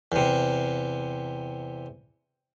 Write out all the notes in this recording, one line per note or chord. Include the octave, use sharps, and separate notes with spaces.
E2 C3